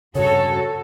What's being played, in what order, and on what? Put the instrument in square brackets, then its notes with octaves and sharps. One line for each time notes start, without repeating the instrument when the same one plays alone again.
[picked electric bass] G2 C#3 [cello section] F#4 A4 [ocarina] C#5